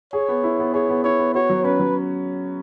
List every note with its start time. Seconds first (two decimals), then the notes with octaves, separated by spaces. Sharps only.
0.13 G#4 C#5
0.28 B3
0.44 E4
0.59 B3
0.74 G#4 C#5
0.89 B3
1.04 E4 C#5
1.19 B3
1.35 F#4 C#5
1.49 F#3
1.64 C#4 B4
1.80 F#3